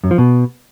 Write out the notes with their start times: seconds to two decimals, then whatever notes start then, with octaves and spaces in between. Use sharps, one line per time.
0.04 F#2
0.11 F3
0.18 B2